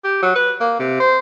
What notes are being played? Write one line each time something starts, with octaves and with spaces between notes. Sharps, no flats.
G4
F#3
B4
A#3
C3
C5